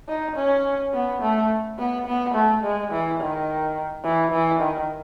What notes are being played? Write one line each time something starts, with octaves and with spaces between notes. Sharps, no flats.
D#4
C#4
B3
A3
B3
B3
A3
G#3
E3
D#3
E3
E3
D#3